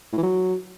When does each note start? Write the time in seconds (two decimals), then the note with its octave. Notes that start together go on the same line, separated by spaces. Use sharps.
0.12 A2
0.18 E3
0.23 F#3